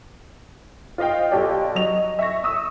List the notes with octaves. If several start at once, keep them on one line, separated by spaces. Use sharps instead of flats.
F4 C5 D#5 F5 G5
B1 G4 A4 D5 G5
F#3 D#5 F7
E5 C#6 A#6
C#6 D#6 E6